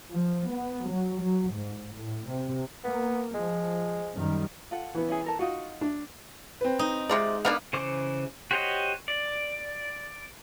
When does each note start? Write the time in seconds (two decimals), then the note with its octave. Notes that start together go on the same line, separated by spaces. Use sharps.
0.12 F3
0.53 B3
0.88 F#3
1.21 F#3
1.51 G#2
1.93 A2
2.29 C3
2.84 A#3 B3
3.34 F3 G#3
4.14 F#2 D#3 G3
4.71 F4 A4 F#5
4.95 E3 B3
5.08 C#4 E4 G#4
5.24 A4 A#4 A5
5.39 D#4 F4 F#4 F#5
5.81 D4
6.61 C4 B4
6.79 D#4
7.09 C3 G#3 F4 D5
7.45 A#3 B3 D4 F5
7.73 C#3 E3 C5 C#6 D6
8.51 F#4 G4 C5 C#5 D#5
9.08 D5